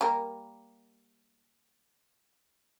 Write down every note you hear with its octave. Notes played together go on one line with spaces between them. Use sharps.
G3 A#3 A#4